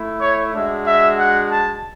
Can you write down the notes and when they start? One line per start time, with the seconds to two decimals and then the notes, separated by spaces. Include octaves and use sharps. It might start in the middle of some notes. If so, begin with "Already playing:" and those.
Already playing: A3 E4
0.20 C#5
0.53 G#3 D4 F#4 E5
0.86 E5
1.19 F#5
1.51 A5